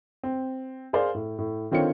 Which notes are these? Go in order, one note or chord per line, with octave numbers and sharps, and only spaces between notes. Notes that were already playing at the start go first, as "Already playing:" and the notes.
C4
G#4 A#4 C5 D5 F5
A2
A2
D3 D#3 C4 F4 C#5 C#7